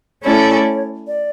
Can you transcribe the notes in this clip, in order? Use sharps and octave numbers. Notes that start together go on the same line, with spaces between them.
A3 C#4 E4 A4 C#5 D5
D5